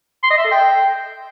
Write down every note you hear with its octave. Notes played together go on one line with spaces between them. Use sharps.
C6
D#5
E5
A4
G5